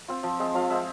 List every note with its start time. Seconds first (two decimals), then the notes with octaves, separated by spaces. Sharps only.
0.08 C4 F4
0.23 F3
0.40 G#3 C4
0.54 F3 F5
0.70 G#3 C4 E5